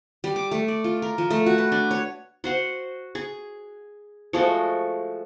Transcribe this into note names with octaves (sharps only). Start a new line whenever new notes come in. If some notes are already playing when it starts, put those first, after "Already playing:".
G3
D6
A3
D5
F4
A#4
F3
A3
F#4
B4
D4
C#5
F#4 C5 F#5
G#4
F3 G#3 A3 F#4